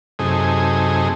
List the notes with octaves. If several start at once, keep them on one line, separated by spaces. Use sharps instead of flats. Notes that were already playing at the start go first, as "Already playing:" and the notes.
F#2 C3 A3 D#4 G#4